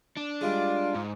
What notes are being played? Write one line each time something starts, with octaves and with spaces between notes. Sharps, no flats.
D4
G3 G#3 F4
G#2